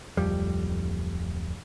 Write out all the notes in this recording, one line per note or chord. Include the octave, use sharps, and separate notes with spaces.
D1 B1 F2 G3